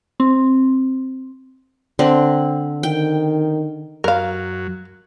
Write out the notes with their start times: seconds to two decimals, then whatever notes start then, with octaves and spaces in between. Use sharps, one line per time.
0.20 C4
1.99 D3 C4
2.83 D#3 G5
4.04 F#2 F#3 A#4 F5